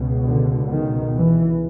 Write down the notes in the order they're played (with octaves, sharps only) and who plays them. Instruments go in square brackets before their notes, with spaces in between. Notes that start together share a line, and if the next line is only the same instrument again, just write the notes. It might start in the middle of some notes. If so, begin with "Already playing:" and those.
Already playing: [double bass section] C#2 B2
D3
D#3
E3